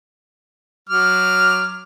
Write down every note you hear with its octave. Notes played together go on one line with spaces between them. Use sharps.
F#3 D6 F6